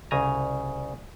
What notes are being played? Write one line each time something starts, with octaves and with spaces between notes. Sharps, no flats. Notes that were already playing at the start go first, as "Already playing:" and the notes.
C2 C#3 G#5 A#5